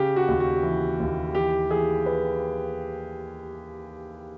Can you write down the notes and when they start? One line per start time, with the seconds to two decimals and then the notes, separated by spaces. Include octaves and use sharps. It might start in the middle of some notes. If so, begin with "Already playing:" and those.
Already playing: C#3 G4
0.16 F#4
0.28 D#2
0.40 F#4
0.63 E3
1.00 D#2
1.34 E3 G4
1.70 E3 G#4
2.06 B4